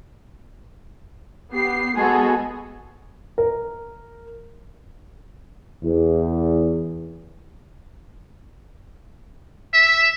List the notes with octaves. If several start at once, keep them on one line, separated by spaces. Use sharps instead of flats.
B3 G4 C7
G#3 B3 F#4 G#4 A4
A#4
E2
E5